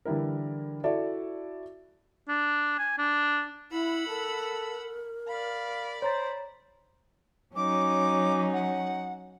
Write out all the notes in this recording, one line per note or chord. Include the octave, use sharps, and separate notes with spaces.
D3 E3 G3 E4 A#4
E4 F#4 A4 D5 E5
D4
G#5
D4
E4 F#5 B5 E6
A4 A#4
D5 F5 B5
C5 C#5 A#5 A6
F#3 C#4 D#4 D6
F#5